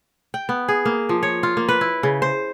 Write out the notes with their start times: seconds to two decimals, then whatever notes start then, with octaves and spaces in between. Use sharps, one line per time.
0.34 G5
0.49 B3
0.68 G#4
0.85 A#3
1.09 F3
1.23 C#5
1.43 F4
1.57 A#3
1.69 B4
1.81 E4
2.03 C#3
2.22 C5